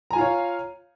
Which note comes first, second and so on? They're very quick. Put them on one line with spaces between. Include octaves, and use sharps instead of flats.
A#5 G#5 F4 F5 C#5